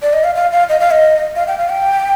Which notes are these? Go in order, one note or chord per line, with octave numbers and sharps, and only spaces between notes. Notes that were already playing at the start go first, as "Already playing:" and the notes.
D5
D#5
F5
F5
F5
D#5
F5
D#5
F5
G5
F5
G5